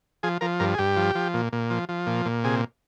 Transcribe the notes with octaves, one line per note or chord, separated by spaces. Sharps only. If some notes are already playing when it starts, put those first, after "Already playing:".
F3 G#4
F3 A#4
G2 A#4
G#4
G2 G4
F3
F3
A#2
A#2
F3
F3
A#2
A#2
C3 G#4